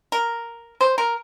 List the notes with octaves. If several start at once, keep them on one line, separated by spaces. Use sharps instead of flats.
A#4
C5
A#4